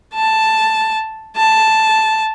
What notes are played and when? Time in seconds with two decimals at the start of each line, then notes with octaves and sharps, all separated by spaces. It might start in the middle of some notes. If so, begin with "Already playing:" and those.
0.14 A5
1.36 A5